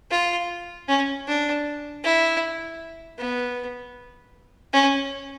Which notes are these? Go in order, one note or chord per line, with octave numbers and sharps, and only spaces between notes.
F4
C#4
D4
E4
B3
C#4